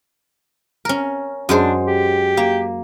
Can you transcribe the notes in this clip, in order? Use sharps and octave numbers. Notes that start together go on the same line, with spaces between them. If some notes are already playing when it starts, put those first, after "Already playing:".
C#4 A#4
F#2 G#3 D4 C5
G4
A#3